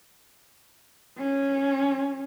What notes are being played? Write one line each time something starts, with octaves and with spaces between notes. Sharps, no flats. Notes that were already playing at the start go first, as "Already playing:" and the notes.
C#4